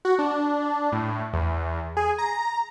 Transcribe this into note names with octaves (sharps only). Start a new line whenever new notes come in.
F#4
D4
A2
E2
G#4
A#5